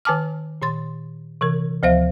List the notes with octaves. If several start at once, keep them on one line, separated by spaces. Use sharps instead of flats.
D#3 B4 G#5 A5 D6 F6
A#2 D#3 C6 A6
C3 E3 A#4
D2 F3 C5 E5 F5